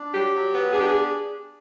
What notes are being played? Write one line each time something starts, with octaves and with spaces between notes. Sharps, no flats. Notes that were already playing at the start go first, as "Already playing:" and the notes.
Already playing: D4
F#3 G4
F#3
B3
D4 G#4
G4
G#4